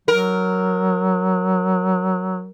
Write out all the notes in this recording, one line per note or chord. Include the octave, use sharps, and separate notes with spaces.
F#3 A#4